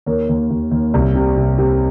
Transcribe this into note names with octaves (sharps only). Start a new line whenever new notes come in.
D#2 A#4 C#5
D#2
D#2
D#2
C2
C3
C3
C3